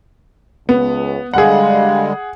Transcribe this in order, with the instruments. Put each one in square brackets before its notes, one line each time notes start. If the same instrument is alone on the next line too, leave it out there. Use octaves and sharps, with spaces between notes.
[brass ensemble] C#2 [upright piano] B3
[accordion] D3 G3 G#3 [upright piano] G#4 F#5 [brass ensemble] F5